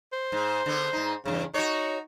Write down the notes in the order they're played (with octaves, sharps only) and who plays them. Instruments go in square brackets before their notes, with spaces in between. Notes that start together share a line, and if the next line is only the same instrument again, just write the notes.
[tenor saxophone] C5
[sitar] G#2
D3 B3
G#2 D#4
[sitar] E2 G2 [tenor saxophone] C#3
[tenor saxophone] D#4 [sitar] F#4 C#5